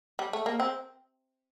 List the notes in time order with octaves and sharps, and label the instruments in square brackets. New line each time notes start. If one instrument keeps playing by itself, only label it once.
[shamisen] G3
A3
A#3
C4